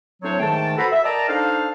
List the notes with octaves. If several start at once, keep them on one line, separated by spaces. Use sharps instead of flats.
A2 F#3 C4 D4 C5 C#5
G#2 D#3 A3 G5 A5
F#4 A4 B4 C5 A#5 B5
E5
A#4 D5 D#5 G5 A5 A#5
D4 D#4 A4 C5 F5